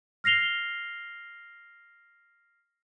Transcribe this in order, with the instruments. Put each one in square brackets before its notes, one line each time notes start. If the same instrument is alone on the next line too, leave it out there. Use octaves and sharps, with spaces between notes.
[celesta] F6 A#6 C7 F7 G7